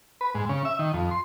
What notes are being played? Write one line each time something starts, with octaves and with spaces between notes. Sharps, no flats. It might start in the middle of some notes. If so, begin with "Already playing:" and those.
B4
G#2
C#3
E5
D#3
F2
C6